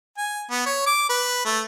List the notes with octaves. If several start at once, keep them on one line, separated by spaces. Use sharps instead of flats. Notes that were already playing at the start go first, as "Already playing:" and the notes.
G#5
B3
C#5
D6
B4
A3